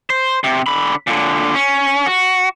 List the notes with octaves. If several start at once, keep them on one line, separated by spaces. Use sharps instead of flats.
C5
C3
D3 B5
A#2 D3
C#4
F#4